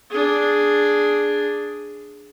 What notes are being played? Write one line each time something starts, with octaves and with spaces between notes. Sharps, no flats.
D4 G#4